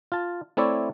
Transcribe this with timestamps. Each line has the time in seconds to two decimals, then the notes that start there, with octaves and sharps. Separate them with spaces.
0.12 F4 A5
0.57 A3 C4 E4 C#5 D5